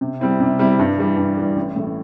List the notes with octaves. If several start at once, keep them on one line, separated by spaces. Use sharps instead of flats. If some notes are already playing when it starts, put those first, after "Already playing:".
C3
G3 C4 E4
C3
G3 C4 E4
G2
E3 G3
G2
E3 G3
A1
A2 E3